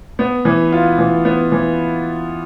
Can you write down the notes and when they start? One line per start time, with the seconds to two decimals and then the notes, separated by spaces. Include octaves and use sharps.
0.19 B3
0.45 E3
0.72 F4
0.98 E3
1.25 B3
1.52 E3